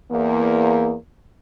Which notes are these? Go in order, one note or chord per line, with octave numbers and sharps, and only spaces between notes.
E2 A#3